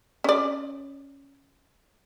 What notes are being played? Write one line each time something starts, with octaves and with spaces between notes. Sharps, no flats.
C#4 D5